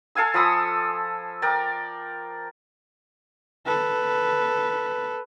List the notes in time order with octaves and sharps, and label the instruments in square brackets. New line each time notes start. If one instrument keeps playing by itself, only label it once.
[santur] A4 F5 G#5 E6
F3 B5 D#6 E6
A#4 D5 G5
[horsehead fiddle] A4 B4